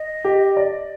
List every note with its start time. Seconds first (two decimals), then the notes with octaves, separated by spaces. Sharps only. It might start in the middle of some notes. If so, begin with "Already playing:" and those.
Already playing: D#5
0.24 G4
0.57 D5